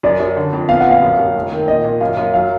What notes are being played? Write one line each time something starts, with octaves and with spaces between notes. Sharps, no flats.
F#2 D5
F#2
D3
F2
B3 F5
A#1 F#5
F5
F#2
F#2
F1
D#3
A#2 D#5
A#2
F#2 F5
F#2
F#3 F5